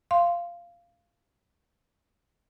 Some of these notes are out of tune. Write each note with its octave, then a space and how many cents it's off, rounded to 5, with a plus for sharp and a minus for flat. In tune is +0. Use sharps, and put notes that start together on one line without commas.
F5 -15 C6 +0